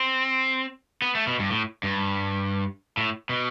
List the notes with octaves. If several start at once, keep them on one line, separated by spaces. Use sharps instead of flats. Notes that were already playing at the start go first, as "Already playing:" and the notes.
Already playing: C4
B3
A3
B2
G2
A2
G2
A2
B2